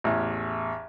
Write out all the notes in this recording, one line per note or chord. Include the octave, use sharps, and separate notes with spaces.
A1 E2